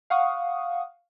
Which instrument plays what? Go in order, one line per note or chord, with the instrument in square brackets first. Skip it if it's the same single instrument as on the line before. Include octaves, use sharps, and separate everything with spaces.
[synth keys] F5 F#5 C#6 D#6